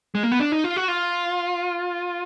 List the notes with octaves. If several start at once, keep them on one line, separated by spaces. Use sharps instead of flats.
G#3
A#3
B3
D4
D#4
F4
F#4
F4